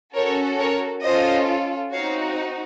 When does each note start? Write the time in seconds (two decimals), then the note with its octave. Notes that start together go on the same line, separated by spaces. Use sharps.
0.15 C#4 F#4 A4 A#4 C#5
0.59 A#4 C#5
1.04 C#4 F4 A4 C5 D#5
1.93 C4 D#4 F#4 C#5 F5